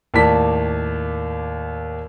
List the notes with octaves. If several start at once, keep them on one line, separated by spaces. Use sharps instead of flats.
D#2 A2 A#3 D5 A5 B6